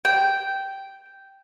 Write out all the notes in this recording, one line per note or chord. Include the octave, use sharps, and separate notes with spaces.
G5